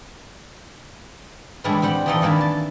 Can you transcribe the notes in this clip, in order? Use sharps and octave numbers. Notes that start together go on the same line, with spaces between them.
A2 E3 G3 G#3 D4 E4
G3 C4 G4 F#5
E3 F3 D#4 A4 D5 D#5
D#3 E3 A#3 D4 E4
A5